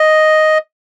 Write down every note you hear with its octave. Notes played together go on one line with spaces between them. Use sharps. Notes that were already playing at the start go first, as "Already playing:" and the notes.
Already playing: D#5